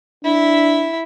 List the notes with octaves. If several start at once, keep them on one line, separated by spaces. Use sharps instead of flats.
D4 E4 E5